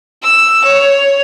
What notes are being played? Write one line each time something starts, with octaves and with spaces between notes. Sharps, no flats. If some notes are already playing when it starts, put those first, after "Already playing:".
E6
C#5